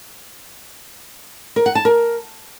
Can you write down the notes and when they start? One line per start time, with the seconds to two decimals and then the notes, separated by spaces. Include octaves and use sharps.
1.56 A#4
1.66 F#5
1.75 A5
1.85 A#4